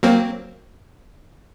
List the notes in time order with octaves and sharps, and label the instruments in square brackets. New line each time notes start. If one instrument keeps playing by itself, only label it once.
[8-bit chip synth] F#3 A#3 C4